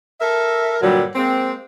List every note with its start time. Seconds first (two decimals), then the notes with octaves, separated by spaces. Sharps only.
0.21 A4 A#4 E5
0.82 G2 A#2 D3 F#3 G3
1.15 G#3 A#3 C4